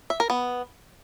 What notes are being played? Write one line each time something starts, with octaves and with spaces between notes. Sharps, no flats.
E5
A#4
B3